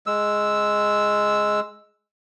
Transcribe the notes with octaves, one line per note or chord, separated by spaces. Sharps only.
G#3 E6